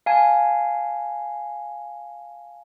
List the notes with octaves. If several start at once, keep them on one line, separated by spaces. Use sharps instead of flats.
F5 G#5 A5